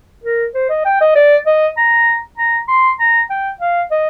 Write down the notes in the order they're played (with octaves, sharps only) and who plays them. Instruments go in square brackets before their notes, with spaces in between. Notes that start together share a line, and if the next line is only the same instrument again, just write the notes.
[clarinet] A#4
C5
D#5
G5
D#5
D5
D#5
A#5
A#5
C6
A#5
G5
F5
D#5